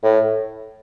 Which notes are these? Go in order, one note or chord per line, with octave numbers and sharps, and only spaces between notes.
A2